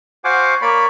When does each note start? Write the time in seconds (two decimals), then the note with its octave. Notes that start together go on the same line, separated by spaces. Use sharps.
0.24 F#4 C5 F5 F#5 G#5 D6
0.62 A#3 C#5 D5 B5